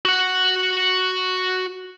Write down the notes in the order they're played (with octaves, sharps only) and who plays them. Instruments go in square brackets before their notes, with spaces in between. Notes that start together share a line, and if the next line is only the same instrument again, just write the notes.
[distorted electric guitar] F#4 F#5